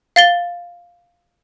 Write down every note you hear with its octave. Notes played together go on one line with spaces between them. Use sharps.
F5 A6 G7